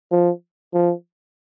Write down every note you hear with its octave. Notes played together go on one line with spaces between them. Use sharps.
F3
F3